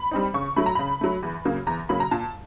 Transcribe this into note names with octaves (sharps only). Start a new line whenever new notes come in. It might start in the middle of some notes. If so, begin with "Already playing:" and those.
Already playing: B5
G3 C4 D#4
C#3 C#6
F#3 A3 B5
A#5
C#3 B5
F#3 A3
E2
C#3 F#3 A#3
E2 A#5
C#3 F#3 A#3 B5
A#5
A#2 A5